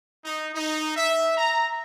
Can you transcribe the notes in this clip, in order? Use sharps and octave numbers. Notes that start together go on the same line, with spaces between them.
D#4
D#4
E5
A#5